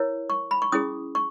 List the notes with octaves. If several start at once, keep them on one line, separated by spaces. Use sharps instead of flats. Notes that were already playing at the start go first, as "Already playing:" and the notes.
Already playing: E4 A#4 C#5
C#6
B5
C#6
C#4 E4 G#4 D#6
C#6